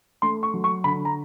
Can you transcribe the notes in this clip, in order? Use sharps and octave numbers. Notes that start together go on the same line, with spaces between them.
A3 C6
C#6
F#3
C#6
D3 B5
A#5